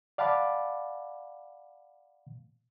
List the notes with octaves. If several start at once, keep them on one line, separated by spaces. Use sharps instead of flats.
D5 F5 F#5 A5 B5 D6